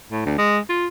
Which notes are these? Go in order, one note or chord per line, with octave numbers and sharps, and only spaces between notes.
A2
D2
G#3
F4